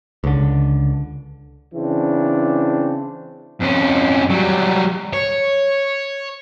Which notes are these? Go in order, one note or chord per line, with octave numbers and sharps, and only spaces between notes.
C#2 D3
C#3 E3 C4 D4
F2 C#4
F#3 G3
C#5